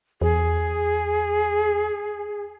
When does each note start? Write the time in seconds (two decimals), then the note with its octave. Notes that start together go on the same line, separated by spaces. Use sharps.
0.22 E2 G#4